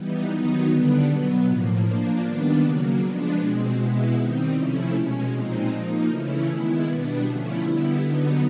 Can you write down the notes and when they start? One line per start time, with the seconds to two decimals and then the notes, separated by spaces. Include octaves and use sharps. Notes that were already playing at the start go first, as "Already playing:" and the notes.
Already playing: E3 G3 B3 D#4
0.30 D#3 F#3 B3 D#4
0.68 D3 G3 B3 D4
1.06 B2 F#3 B3
1.45 A2 F3 A#3
1.83 F3 A#3 D4
2.22 D#3 G3 B3 D4
2.61 C#3 F#3 A#3
2.98 F3 G#3 B3 D4
3.37 B2 G#3 C4
3.75 B2 G#3 B3 E4
4.14 D#3 G3 C4 D#4
4.52 C3 F3 A3 C#4 E4
4.91 B2 G#3 C#4
5.30 A#2 F3 G#3 C4 D#4
5.69 F3 A#3 D#4
6.07 C#3 E3 A3 C#4 E4
6.46 D#3 G#3 B3 E4
6.84 B2 G3 B3 D4
7.23 D3 F3 A3 C#4 E4
7.61 D3 G3 B3 E4
8.00 D3 F#3 B3 D#4